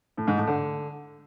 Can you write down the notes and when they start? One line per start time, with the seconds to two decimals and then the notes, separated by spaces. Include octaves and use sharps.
0.17 A2
0.27 G#2
0.37 A2
0.47 D3